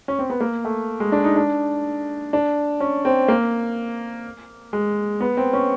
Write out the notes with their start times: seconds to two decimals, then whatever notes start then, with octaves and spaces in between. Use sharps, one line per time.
0.08 C#4
0.19 C4
0.30 B3
0.40 A#3
0.65 A3
1.00 G#3
1.12 D4
1.24 D#4
1.36 D4
2.33 D4
2.80 C#4
3.05 C4
3.28 A#3
4.73 G#3
5.20 B3
5.37 C4
5.53 C#4